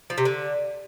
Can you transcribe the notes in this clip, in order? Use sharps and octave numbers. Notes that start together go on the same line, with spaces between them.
F3
C3
D3